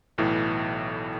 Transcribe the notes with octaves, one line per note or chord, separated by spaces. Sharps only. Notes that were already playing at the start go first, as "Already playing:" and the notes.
B1 A2 E3